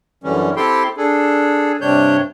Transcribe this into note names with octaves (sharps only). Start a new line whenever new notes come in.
F#2 D3 E3 G3 C#4
C4 E4 G4 A4 G5 C6
D4 G#4 A4
G2 C3 G3 D4 C#5 G6